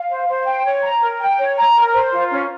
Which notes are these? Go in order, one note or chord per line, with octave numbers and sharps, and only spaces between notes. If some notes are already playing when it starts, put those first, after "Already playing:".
Already playing: F5
C5
C5
G5
C#5
A#5
A#4
G5
C#5
A#5
A#4
C5
F4
C#4